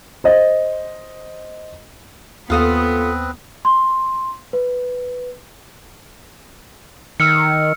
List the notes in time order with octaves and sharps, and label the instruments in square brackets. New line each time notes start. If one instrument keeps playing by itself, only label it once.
[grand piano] C5 D#5
[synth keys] D#2 D#6 [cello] B3 [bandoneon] C4 B4 [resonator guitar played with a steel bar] F4 A4 F5
[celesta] C6
B4
[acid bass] D#3 [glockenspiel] E6 F6 C#7